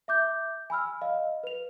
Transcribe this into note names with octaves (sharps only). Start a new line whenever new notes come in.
E5 D6 G6
G#5 B5 E6 F6
D#5 F5
B4 F7